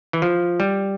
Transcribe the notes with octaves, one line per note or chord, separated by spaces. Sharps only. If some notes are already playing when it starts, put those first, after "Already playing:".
E3
F3
G3